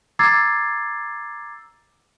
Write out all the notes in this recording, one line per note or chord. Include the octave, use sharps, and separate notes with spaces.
A#5 D6 E6 G#6 A6 C7